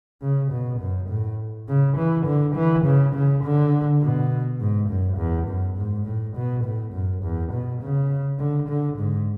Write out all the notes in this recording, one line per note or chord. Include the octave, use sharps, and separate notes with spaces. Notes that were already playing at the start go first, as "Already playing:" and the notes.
C#3
B2
F#2
A2
C#3
E3
D3
E3
C#3
C#3
D3
B2
G#2
F#2
E2
F#2
G#2
A2
B2
A2
F#2
E2
B2
C#3
D3
D3
G#2